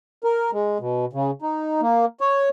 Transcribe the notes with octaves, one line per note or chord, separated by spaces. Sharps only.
A#4
G#3
B2
C#3
D#4
A#3
C#5